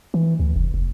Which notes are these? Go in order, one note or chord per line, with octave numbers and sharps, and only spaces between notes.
E3
D2
F1
F1